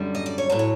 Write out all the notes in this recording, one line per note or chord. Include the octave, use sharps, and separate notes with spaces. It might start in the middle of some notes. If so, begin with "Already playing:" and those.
Already playing: F#2 D3 G3
D#5
D5
C#5
A2 F#3 C5
C#5